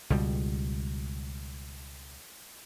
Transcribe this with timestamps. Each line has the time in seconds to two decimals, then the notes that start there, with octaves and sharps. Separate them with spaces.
0.10 C#2 B2 G3